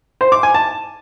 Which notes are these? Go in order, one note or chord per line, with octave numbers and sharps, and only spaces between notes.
C5
D6
G#5
A5